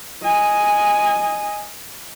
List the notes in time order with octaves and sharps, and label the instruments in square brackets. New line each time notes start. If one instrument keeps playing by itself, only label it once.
[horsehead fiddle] D#5 G#5